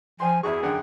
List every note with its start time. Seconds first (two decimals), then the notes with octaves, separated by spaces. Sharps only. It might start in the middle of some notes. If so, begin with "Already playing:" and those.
0.20 F3 C5 G5 G#5 C6
0.43 E2 E4 F#4 G#4 C#6
0.63 F#2 D3 G5